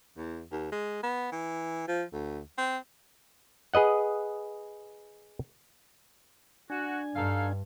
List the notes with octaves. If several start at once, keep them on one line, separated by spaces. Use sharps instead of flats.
E2
D#2
G#3
B3
E3
F3
D2
C4
G#4 B4 D#5 F#5
D4 F#4 G#5
G2 D#4 A4 F5